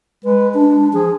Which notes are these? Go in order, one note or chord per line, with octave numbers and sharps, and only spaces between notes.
G#3 B4
D4
F3 G#4